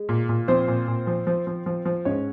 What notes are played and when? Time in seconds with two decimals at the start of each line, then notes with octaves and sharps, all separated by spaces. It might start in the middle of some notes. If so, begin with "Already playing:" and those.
Already playing: G#3
0.09 A#2
0.29 A#2
0.48 F3 C4 C5
0.68 A#2
0.88 A#2
1.07 F3
1.27 F3
1.47 F3
1.66 F3
1.86 F3
2.05 G#2 C#4 C#5